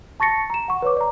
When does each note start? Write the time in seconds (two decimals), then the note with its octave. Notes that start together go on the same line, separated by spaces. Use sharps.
0.20 A5 C#6 A6 A#6 C#7
0.50 A#5 E7
0.68 F#5 C#6
0.82 B4 C#5 D6
0.97 D5 A#5